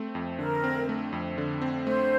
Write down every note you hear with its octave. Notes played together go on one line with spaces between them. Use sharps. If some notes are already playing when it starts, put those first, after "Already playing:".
Already playing: A3 C4
F2
D3 A#4
C4
A3
F2
D3
C4
A3 C5